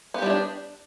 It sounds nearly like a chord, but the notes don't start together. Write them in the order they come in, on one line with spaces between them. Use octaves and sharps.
B3 G4 G3 E4 D4